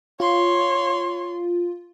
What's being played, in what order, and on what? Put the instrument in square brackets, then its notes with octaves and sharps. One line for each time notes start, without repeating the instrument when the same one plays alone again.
[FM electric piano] F4 [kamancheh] C#5 C6